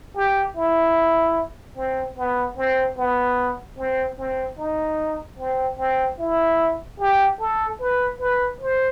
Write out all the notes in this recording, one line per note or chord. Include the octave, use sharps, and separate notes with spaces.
G4
E4
C4
B3
C4
B3
C4
C4
D#4
C4
C4
E4
G4
A4
B4
B4
C5